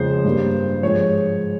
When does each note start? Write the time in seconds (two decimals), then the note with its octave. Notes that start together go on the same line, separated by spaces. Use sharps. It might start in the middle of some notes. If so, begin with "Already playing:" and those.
Already playing: F2 C#3 G#3 C5
0.25 G2 G3 A#3
0.83 G#2 F3 G#3 C#5